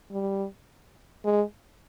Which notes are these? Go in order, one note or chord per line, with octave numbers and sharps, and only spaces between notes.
G3
G#3